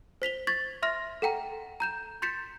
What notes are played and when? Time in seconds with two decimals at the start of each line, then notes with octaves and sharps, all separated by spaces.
0.22 C5 B6 F7 G7
0.47 C#6 G#6 A6 B6
0.82 E5 C6 F6 A#6
1.22 A4 F#5 G5 A#5
1.80 A#5 G6 E7
2.22 C6 G6 A6 B6 C#7 E7